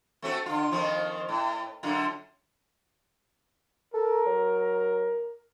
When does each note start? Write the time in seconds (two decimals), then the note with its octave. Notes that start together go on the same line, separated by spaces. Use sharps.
0.22 A3 C4 F#4
0.46 D3 F4
0.72 F2 D#3 F3
1.29 A2
1.83 F#2 D3 F4
3.94 A4 A#4
4.27 F#3